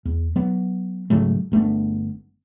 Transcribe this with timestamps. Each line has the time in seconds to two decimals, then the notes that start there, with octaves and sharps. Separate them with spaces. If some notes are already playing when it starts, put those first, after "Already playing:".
0.05 E2
0.36 F#3 B3
1.10 G#2 C#3 F#3 A3
1.52 G1 A3 B3 D4